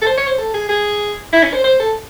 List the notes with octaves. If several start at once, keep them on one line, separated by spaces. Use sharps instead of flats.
A4
C5
C#5
C5
A4
G#4
G#4
E4
C#4
C5
C5
A4